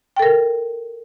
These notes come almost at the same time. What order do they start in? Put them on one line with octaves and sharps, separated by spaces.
G5 A4 A#4